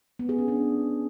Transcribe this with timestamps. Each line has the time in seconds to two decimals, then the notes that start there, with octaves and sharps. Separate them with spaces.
0.19 B3
0.29 G#4
0.39 C#4
0.48 D4